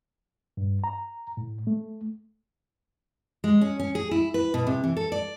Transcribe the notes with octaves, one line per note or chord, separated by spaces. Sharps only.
G2
A#5
A2
A3
G#3
C#4
C#4
G#4
E4
B4
B2
C3
E3
A4
D5